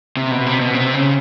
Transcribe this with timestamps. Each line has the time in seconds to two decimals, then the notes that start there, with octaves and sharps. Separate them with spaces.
0.17 C3
0.31 B2
0.46 C3
0.60 B2
0.74 C3
0.94 C#3